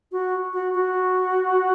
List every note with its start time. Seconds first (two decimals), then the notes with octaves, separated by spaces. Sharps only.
0.11 F#4
0.53 F#4
0.74 F#4